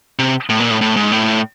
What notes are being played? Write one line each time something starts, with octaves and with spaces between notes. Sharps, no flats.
C3
A2
A#2
A2
A2
G#2
A2